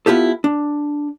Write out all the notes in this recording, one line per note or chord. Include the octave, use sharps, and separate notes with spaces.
B3 E4 F4 G4 A4
D4